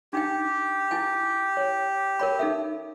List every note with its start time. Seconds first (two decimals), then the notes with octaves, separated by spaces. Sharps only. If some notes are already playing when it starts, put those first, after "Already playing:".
0.13 D4 D#4 G4 G5
0.91 E4 G#5
1.57 C#5
2.19 A#4 C#5 B5
2.39 D#4 A4 E5